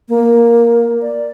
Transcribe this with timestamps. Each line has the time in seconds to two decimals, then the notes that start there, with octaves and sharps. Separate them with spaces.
0.09 A#3
1.02 D5